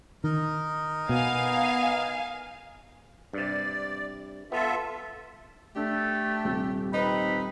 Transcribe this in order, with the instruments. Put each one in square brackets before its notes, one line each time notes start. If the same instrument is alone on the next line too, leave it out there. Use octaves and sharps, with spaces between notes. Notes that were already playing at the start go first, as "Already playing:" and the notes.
[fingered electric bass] D#3 [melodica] D#4 A#4 D#5
[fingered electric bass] B2 [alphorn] B3 [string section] F5 G#5
[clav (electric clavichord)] G2 C3 [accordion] D5
[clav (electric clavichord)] B3 [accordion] F4 A4 E5
[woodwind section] A3 [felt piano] D4 [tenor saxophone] G4
[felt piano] D#1 C3
[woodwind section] C4 B4 B5 [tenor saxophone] D#4